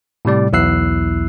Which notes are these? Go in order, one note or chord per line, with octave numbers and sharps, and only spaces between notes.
A2 C3 G3 D5
B1 E2 E4 E6 F#6 C7